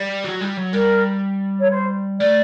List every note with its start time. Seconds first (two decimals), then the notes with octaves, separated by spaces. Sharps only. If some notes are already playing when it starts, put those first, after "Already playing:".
Already playing: G3
0.25 F#3
0.41 G3
0.57 F#3
0.73 G3 A#4
1.60 C#5
1.71 C5
2.20 A3 D5